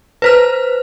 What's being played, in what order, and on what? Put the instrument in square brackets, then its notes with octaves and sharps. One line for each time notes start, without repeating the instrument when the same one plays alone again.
[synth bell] B4 C5 F6